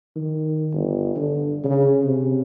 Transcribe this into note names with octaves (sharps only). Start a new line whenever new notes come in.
D#3
G1
D3
C#3
C3